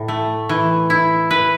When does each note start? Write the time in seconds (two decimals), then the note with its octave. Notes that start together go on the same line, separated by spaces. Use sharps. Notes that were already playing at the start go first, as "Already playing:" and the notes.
Already playing: A2
0.08 A3
0.49 E3
0.90 E4
1.31 B4